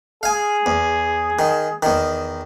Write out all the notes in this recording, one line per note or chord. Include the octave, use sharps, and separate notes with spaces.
G#4 F5 G#5
E2
D#3
E2 D#3